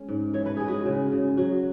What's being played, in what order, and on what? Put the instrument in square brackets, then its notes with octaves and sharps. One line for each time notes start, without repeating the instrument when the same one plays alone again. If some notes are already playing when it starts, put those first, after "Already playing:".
Already playing: [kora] G#3 C#4
G#2
E3 C#5
B4
G#3 G#4
F#4 B4
C#3
C#3
F#3 F#4